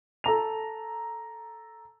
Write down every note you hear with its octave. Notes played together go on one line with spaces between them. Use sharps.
A4 A#5 F7